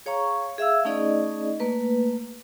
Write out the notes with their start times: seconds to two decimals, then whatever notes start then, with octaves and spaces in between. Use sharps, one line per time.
0.06 G#4 C#5 F5 A#5 C#6
0.58 G#4 E5 F5 E6
0.85 A3 C#4 D#4 G#4 D5 D#5
1.60 A3 A#3 B4